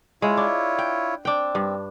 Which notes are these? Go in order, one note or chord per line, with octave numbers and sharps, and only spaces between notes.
G#3 E4 F4 C#5
D4
G5
C4 D4 G5
G2